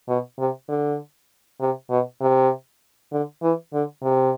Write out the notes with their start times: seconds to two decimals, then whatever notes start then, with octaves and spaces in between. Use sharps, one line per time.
0.08 B2
0.39 C3
0.69 D3
1.61 C3
1.90 B2
2.21 C3
3.12 D3
3.43 E3
3.73 D3
4.03 C3